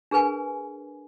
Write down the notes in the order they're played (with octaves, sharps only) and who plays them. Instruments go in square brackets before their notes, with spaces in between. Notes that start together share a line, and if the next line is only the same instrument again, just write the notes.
[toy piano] D4 G#4 A#4 B4 G#5